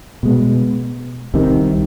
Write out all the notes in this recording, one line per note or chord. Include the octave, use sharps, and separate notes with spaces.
B2 G#3 B3
C2 C3 D#3